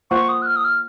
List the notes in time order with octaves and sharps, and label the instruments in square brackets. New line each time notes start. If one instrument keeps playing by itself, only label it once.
[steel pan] A#3 F4 C5 F#5 [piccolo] C#6
[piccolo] D#6
F#6
F6
D#6
F6